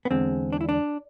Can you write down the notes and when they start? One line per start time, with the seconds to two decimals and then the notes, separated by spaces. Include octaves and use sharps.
0.05 B3
0.10 E2 D3 G#3 C4
0.53 D4
0.61 E4
0.69 D4